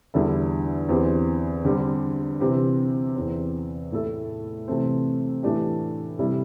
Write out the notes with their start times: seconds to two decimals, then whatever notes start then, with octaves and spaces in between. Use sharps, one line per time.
0.14 E2 D3 G3 E4 A4
0.89 E2 E3 C4 G4
1.65 D3 G3 C4 G4
2.40 C3 E3 C4 G4
3.16 E2 E3 C4
3.92 A2 A3 E4 A4
4.68 C3 E3 A3 C4
5.43 A2 E3 A3 D4 G4
6.19 C3 G3 E4